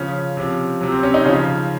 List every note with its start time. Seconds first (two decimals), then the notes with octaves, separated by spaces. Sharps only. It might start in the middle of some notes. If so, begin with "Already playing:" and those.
Already playing: C#3 F3 C#4
0.37 C3 F3
0.81 C3 F#3
0.92 C4
1.03 C#4
1.14 D#4
1.25 C#3 F3 C#4